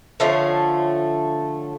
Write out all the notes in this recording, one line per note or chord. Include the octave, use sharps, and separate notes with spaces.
D3 F3 A3 C#4